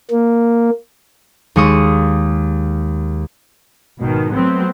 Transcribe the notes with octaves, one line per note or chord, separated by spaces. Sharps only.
A#3
D#2 G#3 C#6 D#6
G#1 B2 D#3
F#3 A3 B3 C4